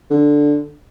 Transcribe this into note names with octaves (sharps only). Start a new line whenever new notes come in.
D3